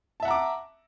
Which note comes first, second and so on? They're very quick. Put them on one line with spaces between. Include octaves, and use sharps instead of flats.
A5 E5 F#5 A#5 D6